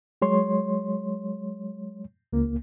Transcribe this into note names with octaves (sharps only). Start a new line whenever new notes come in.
F#3 G#3 C#5 C6
C#2 A#3